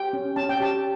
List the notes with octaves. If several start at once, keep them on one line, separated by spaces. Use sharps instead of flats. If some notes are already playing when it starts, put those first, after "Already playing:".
Already playing: G4 G5
C#4
C#4 A5
G5
G4 A5